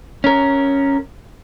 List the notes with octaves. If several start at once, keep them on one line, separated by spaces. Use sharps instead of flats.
C#4 A#4